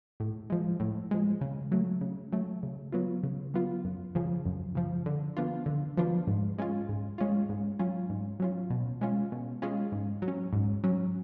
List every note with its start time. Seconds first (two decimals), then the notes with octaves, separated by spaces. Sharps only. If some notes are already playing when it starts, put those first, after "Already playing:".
0.20 A2
0.50 F3 G#3
0.80 A2
1.11 F3 G#3
1.41 C#3
1.72 F#3 A3
2.01 C#3
2.32 F#3 A3
2.63 C#3
2.92 F#3 B3 F4
3.23 C#3
3.54 F#3 B3 F4
3.85 F#2
4.15 C#3 F3
4.46 F#2
4.75 C#3 F3
5.06 D3
5.37 F3 B3 D4 F4
5.66 D3
5.97 F3 B3 D4 F4
6.27 G#2
6.58 G#3 C#4 F4
6.89 G#2
7.18 G#3 C#4 F4
7.49 G#2
7.79 F#3 C#4 F4
8.10 G#2
8.40 F#3 C#4 F4
8.70 B2
9.01 G#3 C#4 F4
9.32 B2
9.62 G#3 C#4 F4
9.92 G#2
10.22 F#3
10.28 C#4
10.53 G#2
10.84 F#3 C#4